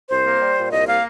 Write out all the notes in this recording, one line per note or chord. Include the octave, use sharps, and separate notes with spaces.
C2 C5
A#3
G3
A#2
C2 D#5
A#3 F5